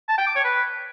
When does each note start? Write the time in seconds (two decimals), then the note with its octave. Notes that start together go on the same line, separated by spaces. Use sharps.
0.09 A5
0.18 G5
0.27 D6
0.36 C#5
0.44 B4